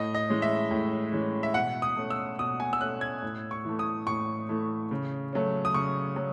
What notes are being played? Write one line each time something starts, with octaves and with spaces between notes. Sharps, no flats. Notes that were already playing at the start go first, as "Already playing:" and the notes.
Already playing: A2 D#5
D#5
E3 G#3 C#4
E5
A2
E3 G#3 C#4
E5
B2 F#5
D#6
A3 C#4
E6
B2 D#6
G#5
E6
A3 C#4 F#6
G#6
A2
C#6
E3 A3
D#6
A2 C#6
E3 A3
C#3
F#3 A3 C#4
D#6
C#3 C#6
F#3